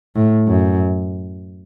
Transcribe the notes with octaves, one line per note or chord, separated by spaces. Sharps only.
A2
F#2